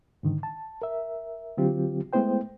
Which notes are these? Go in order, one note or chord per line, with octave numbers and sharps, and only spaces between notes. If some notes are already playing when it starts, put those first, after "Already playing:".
G#2 D3 D#3
A5
A#4 E5
D3 F#3 C4 F4 G4
G#3 A3 B3 E4 C5 G5